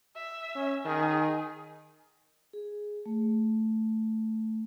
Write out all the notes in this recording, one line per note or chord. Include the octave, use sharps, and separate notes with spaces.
E5
C#4
D#3 G#4
G#4
A3